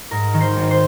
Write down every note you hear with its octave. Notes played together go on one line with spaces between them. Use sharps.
G#2 A#4
D#3
C5
G#1
C5